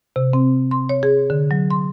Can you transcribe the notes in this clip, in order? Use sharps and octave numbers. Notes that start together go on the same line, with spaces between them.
C3
C4
C6
C#5
G#4
D3
F#3
C6